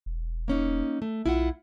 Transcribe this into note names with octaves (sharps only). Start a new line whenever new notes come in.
E1
A#3 C#4 D#4
A3
B1 E4 F4 F#5